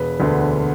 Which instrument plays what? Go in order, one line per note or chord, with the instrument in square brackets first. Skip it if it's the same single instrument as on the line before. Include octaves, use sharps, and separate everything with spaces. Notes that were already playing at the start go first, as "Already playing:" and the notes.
Already playing: [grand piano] E1 B4
D2 D3 B3